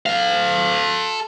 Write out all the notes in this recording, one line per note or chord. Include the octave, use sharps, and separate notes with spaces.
A4 F5